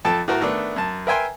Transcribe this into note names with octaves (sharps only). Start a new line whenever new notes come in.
F2 A4 G5 A5
A2 F#4 A#4 A#5
D#3 A3 B3 D4
F#2 A5
A#4 B4 E5 G5 G#5 C6